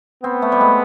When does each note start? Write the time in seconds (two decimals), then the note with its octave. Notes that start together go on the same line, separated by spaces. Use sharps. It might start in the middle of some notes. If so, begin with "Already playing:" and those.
0.23 B3 C4
0.42 A3
0.52 G3
0.61 G#3